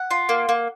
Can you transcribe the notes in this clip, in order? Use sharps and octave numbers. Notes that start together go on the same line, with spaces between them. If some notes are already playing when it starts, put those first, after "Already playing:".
Already playing: F#5
F4
A#3
A#3